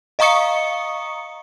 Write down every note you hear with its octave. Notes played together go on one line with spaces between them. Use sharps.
D#5 F5 A#5 C#6 D#6 C#7